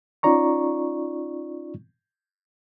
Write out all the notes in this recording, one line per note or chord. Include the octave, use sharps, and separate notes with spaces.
C#4 D#4 F4 D5 A#5 C#6